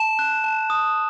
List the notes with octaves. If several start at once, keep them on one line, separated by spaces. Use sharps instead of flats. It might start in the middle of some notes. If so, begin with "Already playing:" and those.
Already playing: A5 E7
F#6
A5
D#6